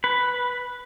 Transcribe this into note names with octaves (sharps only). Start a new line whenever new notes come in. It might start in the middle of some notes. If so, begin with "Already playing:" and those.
B4